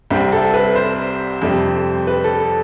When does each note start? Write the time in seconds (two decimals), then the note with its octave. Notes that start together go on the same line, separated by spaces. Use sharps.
0.10 C2 C3 G3 C4
0.32 A4
0.54 B4
0.75 C5
1.42 F2 C3 G3 C4
2.07 B4
2.24 A4
2.40 A4